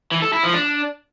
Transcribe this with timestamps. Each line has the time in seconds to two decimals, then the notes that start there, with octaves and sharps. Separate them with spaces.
0.12 E3
0.22 A4
0.33 E4
0.43 F3
0.54 D4